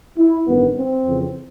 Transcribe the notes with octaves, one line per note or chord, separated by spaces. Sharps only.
E4
A1 G2 D#3 B3
C4
F2 C#3 E3